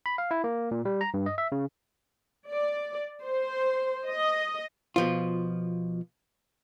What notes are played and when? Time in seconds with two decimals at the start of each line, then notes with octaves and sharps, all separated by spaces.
0.06 B5
0.18 F5
0.31 E4
0.44 A#3
0.71 A#2
0.85 G3
1.01 A#5
1.14 G2
1.26 D#5
1.38 E5
1.52 C#3
2.48 D5
3.24 C5
4.08 D#5
4.96 B2 F3 F4